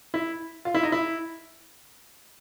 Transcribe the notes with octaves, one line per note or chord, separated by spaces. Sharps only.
E4
F4
E4
D#4
E4